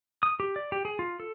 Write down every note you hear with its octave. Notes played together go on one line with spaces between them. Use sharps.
D#6
G4
D5
G4
G#4
F4
A4